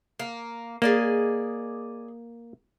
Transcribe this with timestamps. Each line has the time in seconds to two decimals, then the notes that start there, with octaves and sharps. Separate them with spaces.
0.19 A#3
0.82 A#3 G#4 D5 D#5